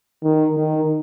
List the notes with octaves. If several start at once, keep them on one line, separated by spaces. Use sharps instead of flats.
D#3
D#3